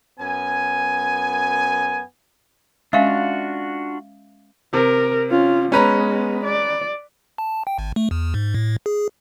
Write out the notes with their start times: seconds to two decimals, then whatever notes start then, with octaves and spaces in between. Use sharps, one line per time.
0.19 F#2 B3 G#5
2.93 G#3 C#4 D4 F4 F#4 E5 F5
4.73 C3 A#4
5.30 C#4 F4
5.72 G#3 B3 C#4 B4 A#5
6.45 D5
7.38 A5
7.67 G5
7.78 G#1
7.96 A3
8.11 E2
8.34 G#2
8.55 A2
8.86 G#4